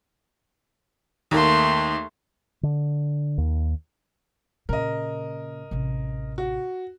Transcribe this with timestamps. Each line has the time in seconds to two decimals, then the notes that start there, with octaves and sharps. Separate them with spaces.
1.31 D#2 A3 A#3 C6
2.63 D3
3.38 D#2
4.69 A#2 C#3 A#4 D#5
5.71 A1 C3
6.38 F#4